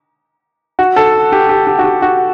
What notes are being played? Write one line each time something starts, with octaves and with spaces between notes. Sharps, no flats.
F#4
A4
G4
G4
G4
F#4
G4
F#4